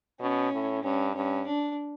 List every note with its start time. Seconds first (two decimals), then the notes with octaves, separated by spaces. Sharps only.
0.20 B2 C#4
0.52 A2
0.83 G2 C#4
1.15 G2 C#4
1.47 D4